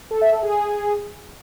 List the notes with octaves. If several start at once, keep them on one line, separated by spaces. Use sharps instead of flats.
A4
E5
A4
G#4